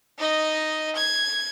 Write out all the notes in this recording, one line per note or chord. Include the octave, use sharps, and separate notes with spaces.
D#4 D#5
G#6